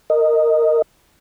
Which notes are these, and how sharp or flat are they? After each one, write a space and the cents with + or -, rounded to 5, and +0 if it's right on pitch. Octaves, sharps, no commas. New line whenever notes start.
A#4 -15 D#5 +0